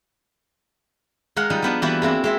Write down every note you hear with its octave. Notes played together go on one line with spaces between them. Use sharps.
G#3 A#4 F5 F#5
F3 G3 D#4
F3 B3 D4
E3 G3 A#3 B3 E4 F#4
G#3 A#3 C4 E4
G#3 C4 E5